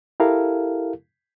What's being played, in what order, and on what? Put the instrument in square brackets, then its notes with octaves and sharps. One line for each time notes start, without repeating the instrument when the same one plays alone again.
[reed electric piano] E4 G4 A4 A#4 F5